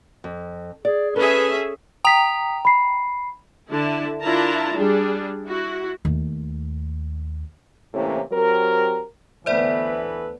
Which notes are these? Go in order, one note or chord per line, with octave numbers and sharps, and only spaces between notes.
F2
G#4 D5
C#4 G#4 A4 B4 E5
G5 A#5 D#6 B6 F7
B5 C7
D3 E4 A5
D4 E4 F4 A#4 A5 A#5
G3 D4 G#4
E4 F#4
D#2 A3
A2 C3 E3 A#3 C#4
F#3 C4 G4 A#4
D2 E3 B3 A4 B4 C5 D5 E5